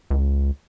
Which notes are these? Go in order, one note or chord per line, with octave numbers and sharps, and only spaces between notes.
C#2